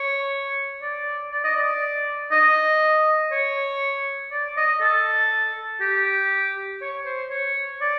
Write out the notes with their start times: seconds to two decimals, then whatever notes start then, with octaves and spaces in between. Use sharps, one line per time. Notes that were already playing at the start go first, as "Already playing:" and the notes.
Already playing: C#5
0.82 D5
1.31 D5
1.44 D#5
1.56 D5
2.31 D#5
3.32 C#5
4.31 D5
4.57 D#5
4.81 A4
5.81 G4
6.81 C#5
7.05 C5
7.30 C#5
7.81 D5